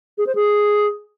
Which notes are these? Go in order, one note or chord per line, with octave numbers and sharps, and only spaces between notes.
G#4
C5
G#4